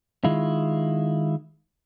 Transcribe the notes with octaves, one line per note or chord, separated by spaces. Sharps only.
D#3 G#3 E4 F4